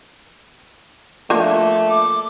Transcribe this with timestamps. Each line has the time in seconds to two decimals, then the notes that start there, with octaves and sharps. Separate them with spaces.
1.30 F3 A3 A#3 D4
1.89 D6